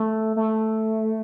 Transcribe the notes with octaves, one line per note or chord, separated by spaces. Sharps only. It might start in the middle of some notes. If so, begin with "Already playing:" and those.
Already playing: A3
A3